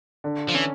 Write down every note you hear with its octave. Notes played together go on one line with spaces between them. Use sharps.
D3
F3
E3 C#4